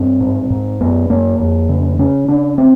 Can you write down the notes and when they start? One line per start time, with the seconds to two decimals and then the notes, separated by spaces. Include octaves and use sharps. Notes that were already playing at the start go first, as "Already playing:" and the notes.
Already playing: G2 C4
0.21 G#2
0.50 G#2
0.81 F#2 B3
1.10 F#2 A#3
1.40 F2
1.69 C#3
1.99 C#3 C#4
2.28 C#3 D4
2.58 C4